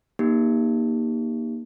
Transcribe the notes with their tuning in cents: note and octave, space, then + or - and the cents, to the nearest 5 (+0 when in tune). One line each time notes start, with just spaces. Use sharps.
A#3 +15 D#4 -10 G4 +10